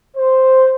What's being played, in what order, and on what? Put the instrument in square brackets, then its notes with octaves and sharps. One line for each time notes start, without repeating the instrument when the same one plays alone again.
[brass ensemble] C5